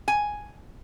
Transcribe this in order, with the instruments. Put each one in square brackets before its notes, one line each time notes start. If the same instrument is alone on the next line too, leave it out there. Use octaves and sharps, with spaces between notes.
[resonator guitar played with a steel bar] G#5